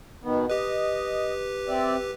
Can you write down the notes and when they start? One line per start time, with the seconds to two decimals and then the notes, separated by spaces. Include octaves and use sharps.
0.24 B2 D#3 B3
0.49 G4 B4 D#5
1.68 C4 D5 E5